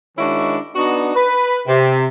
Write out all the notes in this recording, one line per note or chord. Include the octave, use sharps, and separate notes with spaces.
D#3 G#3 C#4 D4 E4 F#4
B3 D4 D#4 F#4
B4
C3